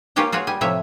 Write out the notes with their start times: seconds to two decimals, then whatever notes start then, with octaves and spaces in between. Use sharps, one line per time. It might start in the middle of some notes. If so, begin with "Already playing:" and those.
0.16 A#3 C#4 F4 G4 C#5 G5
0.32 F4 F#4 G#4 C#5
0.47 G3 G#5
0.61 A2 C3 F3 C#5 E5